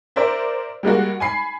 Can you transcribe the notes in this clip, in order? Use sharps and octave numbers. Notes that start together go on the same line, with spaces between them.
A#4 C5 D5 E5
G3 G#3 A#3 F#4
G#5 B5 C7